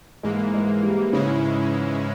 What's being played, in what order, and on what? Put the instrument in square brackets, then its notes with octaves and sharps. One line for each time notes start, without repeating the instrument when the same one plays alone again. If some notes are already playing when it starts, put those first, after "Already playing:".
[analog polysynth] G#2 E3 A#3 [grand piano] G#3
[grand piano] G#3
G3
[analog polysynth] G#2 E3 G#3 C#4 E4 [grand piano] C#3